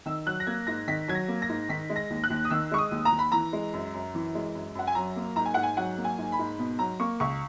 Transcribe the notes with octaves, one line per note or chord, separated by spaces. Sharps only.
D#3 E6
F#3 F#6
A#6
A#3 G#6
G#2 A#6
D#3 B6
F#3 G#6
A#6
A#3
A#6
G#2
D#3 B6
G#3
A#6
D#2
F#6
D#2
D#6
D#3 E6
G#3 C#6
D#6
D#2
A#5
D#2
B5
E3 A#5
G#3
F#2
F#2
E3
G#3
F#2
F#2 F#5
G#5
F#3 A#5
A#3
G#2 A#5
G#5
G#2 F#5
G#5
F#3 F#5
A#3
G#5
G#2
B5
G#2
B2
F#3 A#5
A#3 C#6
C#2 C#6